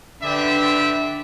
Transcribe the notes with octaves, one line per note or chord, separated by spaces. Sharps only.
D3 G4 B4 D5 E5